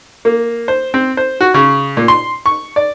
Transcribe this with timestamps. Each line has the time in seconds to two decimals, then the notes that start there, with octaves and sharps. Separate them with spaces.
0.25 A#3
0.68 C5
0.94 C4
1.17 C5
1.41 F#4
1.54 C#3
1.97 A#2
2.08 C6
2.46 C#6
2.76 D5